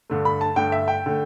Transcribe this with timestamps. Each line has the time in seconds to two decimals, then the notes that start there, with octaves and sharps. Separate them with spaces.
0.10 G2 D3 A3
0.25 B5
0.41 A5
0.56 G2 D3 A3 G5
0.72 E5
0.88 G5
1.06 D3 A3